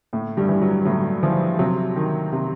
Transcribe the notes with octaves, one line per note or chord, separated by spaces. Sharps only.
A2
G2 G3
E3
F#3
A2 F#3
E3 F3
C3 F#3
D#3
C3